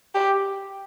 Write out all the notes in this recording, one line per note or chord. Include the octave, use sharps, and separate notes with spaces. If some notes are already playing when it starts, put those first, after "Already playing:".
G4